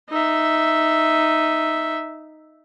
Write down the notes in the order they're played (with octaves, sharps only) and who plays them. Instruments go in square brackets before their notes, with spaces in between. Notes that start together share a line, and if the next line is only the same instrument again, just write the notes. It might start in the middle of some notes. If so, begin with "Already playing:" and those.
[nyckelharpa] D#4 E5